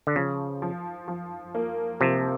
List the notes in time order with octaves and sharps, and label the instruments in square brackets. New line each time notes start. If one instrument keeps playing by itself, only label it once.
[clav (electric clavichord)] D3
[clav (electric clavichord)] C#3 [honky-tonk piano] F3
[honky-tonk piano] F3
F3
A#3
[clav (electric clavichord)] C3 [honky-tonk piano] F3